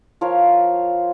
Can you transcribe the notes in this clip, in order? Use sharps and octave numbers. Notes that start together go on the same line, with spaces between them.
F3 F4 A#4 C#5